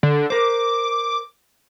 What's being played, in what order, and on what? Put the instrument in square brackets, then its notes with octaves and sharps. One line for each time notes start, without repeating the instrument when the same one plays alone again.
[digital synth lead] D3
[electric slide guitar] A#4 C5 [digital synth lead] D6